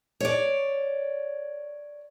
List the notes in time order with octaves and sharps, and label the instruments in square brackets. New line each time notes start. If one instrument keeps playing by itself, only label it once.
[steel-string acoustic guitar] C#5 D5